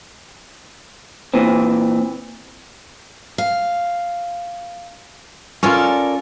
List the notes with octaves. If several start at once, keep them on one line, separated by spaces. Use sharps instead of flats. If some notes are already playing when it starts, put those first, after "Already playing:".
A#2 E3 C4
F5
C#4 F4 A4 A#4 D5